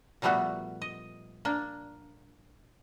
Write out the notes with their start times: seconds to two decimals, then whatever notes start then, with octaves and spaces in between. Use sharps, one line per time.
0.22 A#2 F3 G3 A3 B3 F#4
0.82 D#5
1.45 A#3 D4